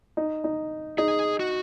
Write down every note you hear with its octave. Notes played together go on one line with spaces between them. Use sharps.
D#4
D#4
D#4 G#4
F#4